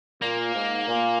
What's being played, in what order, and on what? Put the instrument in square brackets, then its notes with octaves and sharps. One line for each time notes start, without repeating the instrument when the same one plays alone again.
[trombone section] A#2 [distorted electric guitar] A#3
[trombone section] G#2
A#2